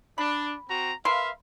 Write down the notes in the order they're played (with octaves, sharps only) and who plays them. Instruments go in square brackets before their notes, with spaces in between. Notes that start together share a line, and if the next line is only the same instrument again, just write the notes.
[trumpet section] D4 [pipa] B5
[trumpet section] C4 F#4 A#5
[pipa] A#4 B4 C6 [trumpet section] E5 F5